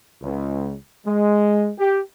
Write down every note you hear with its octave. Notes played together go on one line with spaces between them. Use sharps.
C#2
G#3
G4